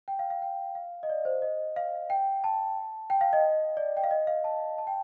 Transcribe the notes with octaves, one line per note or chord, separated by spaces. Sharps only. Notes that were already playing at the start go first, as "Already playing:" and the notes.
G5
F5
F5
G5
F5
D#5
D5
C5
D#5
F5
G5
A5
G5
F5
D#5
D5
G5
F5
D#5
F5
A5
A5
G5